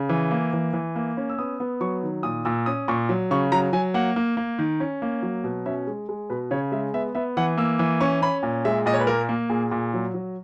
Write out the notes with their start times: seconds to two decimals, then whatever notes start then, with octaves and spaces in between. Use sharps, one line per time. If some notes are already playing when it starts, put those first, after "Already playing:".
Already playing: C#3
0.09 E3
0.31 A#3
0.53 E3
0.74 E3
0.96 A#3
1.17 C#4
1.29 E6
1.38 B3 D#6
1.60 B3
1.81 F#3 C#6
2.03 D#3
2.23 A#2 D#6
2.45 A#2 E6
2.66 C#4 D#6
2.88 A#2 C#6
3.09 F#3
3.31 C#3 C#6
3.52 F#3 A#5
3.73 F#3 G#5
3.94 A#3 F#5
4.16 A#3
4.37 A#3
4.59 D#3
4.80 C#4
5.02 A#3
5.22 F#3
5.44 B2
5.66 C#4 E5
5.87 G#3
6.09 G#3
6.30 B2 B4
6.51 C#3 C#5
6.72 G#3 E5
6.94 B3 E5
7.15 B3 E5
7.37 E3 F#5
7.57 A#3 E6
7.79 E3
8.00 C#4 C#6
8.22 C#4 B5
8.43 A#2
8.65 G#3 E5
8.86 A#2 D#5
8.94 C#5
9.00 B4
9.07 A#3 A#4
9.29 A#3
9.50 A#2 G#4
9.71 A#2
9.94 F#3
10.14 F#3